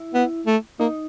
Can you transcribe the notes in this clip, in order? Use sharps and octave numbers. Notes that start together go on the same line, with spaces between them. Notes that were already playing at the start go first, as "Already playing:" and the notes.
Already playing: E4
B3
A3
A#3 D#4